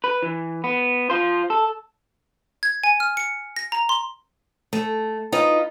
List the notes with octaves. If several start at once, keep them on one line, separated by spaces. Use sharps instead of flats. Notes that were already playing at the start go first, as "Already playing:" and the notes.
B4
E3
B3
F4 C5
A4
G#6
G#5
F6
C#7
A#6
A#5
C6
A3
D#4 F4 B4 D#5